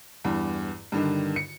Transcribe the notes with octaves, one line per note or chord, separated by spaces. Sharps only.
E2 G2
G2 D3 D#3
C#7